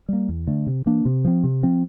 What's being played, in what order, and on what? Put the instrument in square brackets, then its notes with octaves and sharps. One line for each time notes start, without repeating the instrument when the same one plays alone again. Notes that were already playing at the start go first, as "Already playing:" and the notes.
[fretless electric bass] G3 A#3
E2
D3 A3
C3
E3 A#3 D4
C3
F3 C4
C3
F3 C4